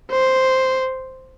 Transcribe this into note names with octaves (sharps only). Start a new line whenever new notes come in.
C5